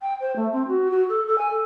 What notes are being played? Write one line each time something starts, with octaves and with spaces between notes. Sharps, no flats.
G5
C5
A3
C4
F#4
F#4
A4
A4
G#5
A4